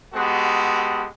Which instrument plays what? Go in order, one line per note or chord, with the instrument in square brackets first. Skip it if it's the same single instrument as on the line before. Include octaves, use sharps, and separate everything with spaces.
[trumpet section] G#3 B3 F#4 G4 A4